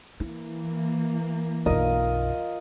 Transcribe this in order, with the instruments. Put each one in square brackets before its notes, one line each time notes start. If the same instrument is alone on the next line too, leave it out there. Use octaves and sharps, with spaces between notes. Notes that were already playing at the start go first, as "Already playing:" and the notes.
[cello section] E3 A#3 [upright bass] E4
[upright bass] B1 F#2 [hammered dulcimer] F4 A#4 D#5